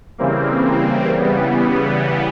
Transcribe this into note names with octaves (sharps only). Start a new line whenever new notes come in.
C#3 E3 G3 A#3 C4
C#3 E3 G3 B3